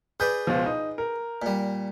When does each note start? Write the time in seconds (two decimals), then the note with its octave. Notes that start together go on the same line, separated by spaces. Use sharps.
0.20 G#4 B4 D5 G6
0.47 C#2 B2 F3
0.66 D#4
0.98 A#4
1.42 A#2 G3